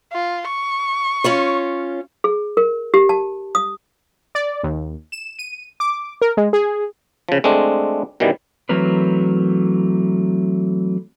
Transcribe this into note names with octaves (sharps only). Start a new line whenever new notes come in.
F4
C#6
C#4 F4 C#5
G#4
A#4
G4
A5
D#6
D5
D#2
E7
D#7
D6
A#4
G#3
G#4
C#3 F3
G#3 A3 C4 D4
B2 D#3 E3 G3
E3 F#3 A3 C4 A#4 B4